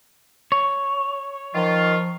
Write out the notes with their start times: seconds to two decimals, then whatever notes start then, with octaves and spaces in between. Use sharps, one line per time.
0.52 C#5
1.55 D#3 F3 F4